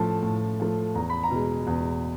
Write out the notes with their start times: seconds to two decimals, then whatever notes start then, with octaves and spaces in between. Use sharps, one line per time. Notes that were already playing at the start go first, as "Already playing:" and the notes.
Already playing: A2 F3 A3 A5
0.23 A2
0.60 F3 A3
0.95 E2 A#5
1.10 B5
1.24 A#5
1.31 B2 G#3
1.67 E2